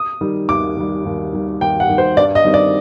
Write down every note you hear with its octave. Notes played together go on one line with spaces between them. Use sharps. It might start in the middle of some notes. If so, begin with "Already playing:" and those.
Already playing: D#6
D#3 G3
D#2 D6
D#3 G3
D#2
D#3 G3
D#2 G5
F#5
D#3 G3
C5
G2 D5
D#5
D#3 G3 C4
D5